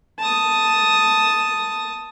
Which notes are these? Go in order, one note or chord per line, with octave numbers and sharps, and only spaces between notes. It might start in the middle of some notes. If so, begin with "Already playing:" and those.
A5 D#6